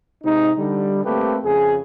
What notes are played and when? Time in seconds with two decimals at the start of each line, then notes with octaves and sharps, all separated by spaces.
0.24 C3 G#3 D#4
0.58 D3 G3
1.05 A3 A#3 C4 G4 B4
1.44 F2 C#3 G#4